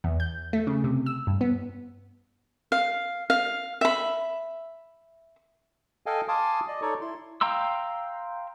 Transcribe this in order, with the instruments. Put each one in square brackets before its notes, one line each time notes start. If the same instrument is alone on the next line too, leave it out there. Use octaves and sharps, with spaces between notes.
[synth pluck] E2
G6
A3
C#3
C3
E6
G2
B3
[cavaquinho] F5
F5
E5 B5
[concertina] A4 D#5 F5 G5 G#5
F5 G#5 A5 C6 D6 D#6
D5 D#5
D#4 A4 C#5 D5 C#6
E4 C6
[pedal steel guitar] F5 G5 A#5 C6 E6